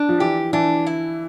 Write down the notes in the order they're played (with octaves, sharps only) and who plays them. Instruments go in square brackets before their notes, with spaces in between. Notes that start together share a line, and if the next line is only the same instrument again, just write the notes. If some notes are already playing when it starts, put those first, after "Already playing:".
Already playing: [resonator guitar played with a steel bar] D4
[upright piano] F3
[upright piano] E3 [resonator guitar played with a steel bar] G4
[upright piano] E3 [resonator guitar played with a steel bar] D4
[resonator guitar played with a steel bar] E4